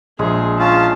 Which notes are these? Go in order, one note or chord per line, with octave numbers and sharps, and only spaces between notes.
A#1 G#3 G#4
C#4 F4 A5